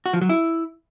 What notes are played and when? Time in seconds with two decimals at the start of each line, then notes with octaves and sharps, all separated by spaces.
0.06 F#4
0.14 F3
0.22 F#3
0.29 E4